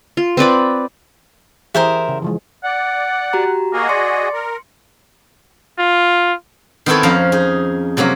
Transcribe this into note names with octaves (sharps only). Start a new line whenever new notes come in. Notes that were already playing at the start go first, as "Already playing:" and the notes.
F4
C4 B4 D5 B5
E3 G4 G#4 A#4 C5 E5
C#3
E3 F3 G#3
D5 F#5
F#4 G4 A#5
A#3 F#4 G#4 D#5
D5 C6 C#7
A#4
F4
D#3 B3 C4 E4 A4 C#5
F2 F3 C#4 F5 A#5
D#4 G#4
C3 F#3 A#3 C#4